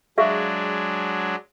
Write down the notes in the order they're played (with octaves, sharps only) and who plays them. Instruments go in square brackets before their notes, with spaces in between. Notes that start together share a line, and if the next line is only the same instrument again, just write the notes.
[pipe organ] F#3 G#3 D4 [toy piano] G#4 E5 F5